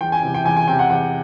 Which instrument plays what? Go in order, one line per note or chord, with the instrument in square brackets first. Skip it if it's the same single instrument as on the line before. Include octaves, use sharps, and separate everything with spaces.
[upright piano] E2 G5
G#5
C3 E3
G5
E2 G#5
G#5
C3 E3 G5
F#5
E2 F#5